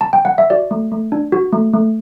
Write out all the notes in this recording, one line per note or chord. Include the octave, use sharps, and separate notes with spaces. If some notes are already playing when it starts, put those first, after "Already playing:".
A5
G5
F#5
E5
F#4 D5
A3
A3
D4
F#4
A3
A3